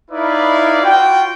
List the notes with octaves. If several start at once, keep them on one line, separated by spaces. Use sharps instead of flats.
D#4 E4 B4 D5 F5
F4 F#4 G5